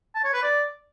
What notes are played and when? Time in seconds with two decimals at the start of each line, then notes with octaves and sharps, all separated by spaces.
0.15 A5
0.24 C#5
0.34 B4
0.43 D5